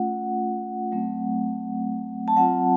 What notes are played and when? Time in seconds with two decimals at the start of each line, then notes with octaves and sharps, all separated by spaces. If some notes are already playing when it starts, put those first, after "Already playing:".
Already playing: A3 C#4 F4 F#5
0.92 F#3 A3 C4
2.28 A5
2.37 F#3 C4 F4 F#5